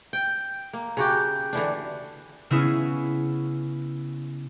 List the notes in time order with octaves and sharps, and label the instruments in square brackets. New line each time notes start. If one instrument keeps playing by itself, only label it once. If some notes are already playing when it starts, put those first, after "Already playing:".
[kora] G5
A#3
C#3 F#4 G4
D3 E3 D4
[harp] C#3 B3 C#4 E4 G#4